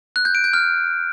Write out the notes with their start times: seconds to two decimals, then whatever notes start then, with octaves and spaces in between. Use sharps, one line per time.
0.16 F#6
0.25 G6
0.35 D7
0.44 G6
0.53 F6